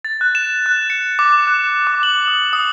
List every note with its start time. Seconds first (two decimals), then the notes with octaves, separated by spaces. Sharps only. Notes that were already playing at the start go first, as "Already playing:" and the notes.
0.05 A6
0.21 F#6
0.35 E7
0.66 F#6
0.90 C#7
1.19 D6
1.47 F#6
1.87 D6
2.03 F#7
2.27 D#6
2.53 D#6